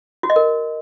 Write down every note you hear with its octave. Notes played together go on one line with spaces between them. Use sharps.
F#4
D#5
A#4